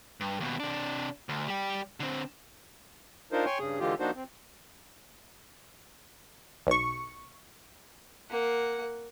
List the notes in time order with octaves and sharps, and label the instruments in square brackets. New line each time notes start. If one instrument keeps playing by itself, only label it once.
[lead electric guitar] G2
D#2 B2
C3 D4
D2
G3 G4
D3 C4
[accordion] D4 D#4 F4 A#4 C5
C#5 G5 G#5 C6 C#6
G2 C#3 G#4
D3 E3 G#3 F4 G4
F3 A#3 D4 D#4 F#4 C5
C4
[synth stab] B1 C#6
[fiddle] A#3 F#5